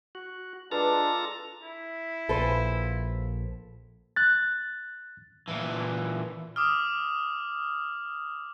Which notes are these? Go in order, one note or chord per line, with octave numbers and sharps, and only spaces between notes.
F#4
G#3 D4 F4 A4 B4 A#5
E4
A#1 A#2 A4 B4 C5
F#6 A6
A#2 E3
D6 D#6 F6